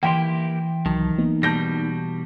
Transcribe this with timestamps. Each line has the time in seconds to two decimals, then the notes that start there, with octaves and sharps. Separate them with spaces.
0.03 E3 A#3 E4 G4 G5 C6
0.86 C2 D#3 F#3 A5
1.18 A#3 B3 D#4
1.43 B2 G3 A5 G6 A#6